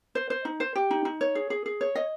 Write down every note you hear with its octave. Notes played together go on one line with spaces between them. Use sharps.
C5
C5
D#4
C5
G4
D#4
D#4
C#5
G#4
G#4
G#4
C#5
D#5